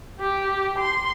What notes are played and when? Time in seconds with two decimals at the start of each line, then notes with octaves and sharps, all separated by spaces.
0.19 G4
0.78 C6